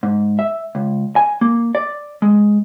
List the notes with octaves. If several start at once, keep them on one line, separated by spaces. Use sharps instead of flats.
G#2
E5
C#2
G#5
A#3
D5
G#3